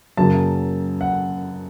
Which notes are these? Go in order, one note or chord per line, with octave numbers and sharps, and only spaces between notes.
F#2 C#3 F#3 A#3 A5
F#5